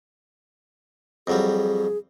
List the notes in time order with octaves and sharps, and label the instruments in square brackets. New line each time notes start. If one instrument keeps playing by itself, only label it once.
[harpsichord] F2 F#3 G3 [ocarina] G#4